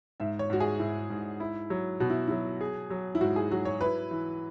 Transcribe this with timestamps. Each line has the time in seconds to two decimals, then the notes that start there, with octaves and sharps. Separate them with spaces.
0.20 G#2 E5
0.39 C#5
0.50 G#2 F#4
0.60 G#4
0.79 G#2 E4
1.10 G#2
1.40 E4
1.70 F#3
2.00 B2 F#4
2.10 E4
2.27 F#3 E4
2.61 G#4
2.90 F#3
3.15 E4
3.21 G#2 F#4
3.36 G#4
3.51 F#3 F#4
3.65 C#5
3.81 E4 B4
4.11 E3